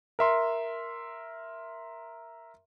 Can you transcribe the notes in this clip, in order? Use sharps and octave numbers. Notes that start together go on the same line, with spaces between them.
A#4 E5 C6